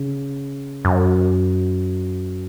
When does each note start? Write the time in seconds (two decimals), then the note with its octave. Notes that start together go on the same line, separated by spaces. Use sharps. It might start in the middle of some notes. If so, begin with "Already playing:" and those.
Already playing: C#3
0.85 F#2